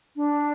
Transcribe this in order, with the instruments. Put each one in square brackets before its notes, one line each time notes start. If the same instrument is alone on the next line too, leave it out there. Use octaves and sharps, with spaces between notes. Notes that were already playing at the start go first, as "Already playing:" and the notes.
[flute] D4